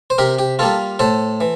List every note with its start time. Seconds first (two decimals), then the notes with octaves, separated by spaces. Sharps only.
0.10 C5
0.18 C3 G4 A#4
0.39 G4
0.59 G3 A#3 F4 A4
0.99 A2 A4 C5
1.41 E3